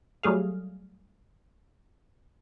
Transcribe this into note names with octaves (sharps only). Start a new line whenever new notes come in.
F#3 G3 A3 G#4 F5